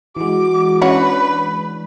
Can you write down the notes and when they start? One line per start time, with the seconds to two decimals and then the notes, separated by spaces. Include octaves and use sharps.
0.17 E3 G#3 F#4 D6
0.82 C#4 D4 F#4 B4 C#5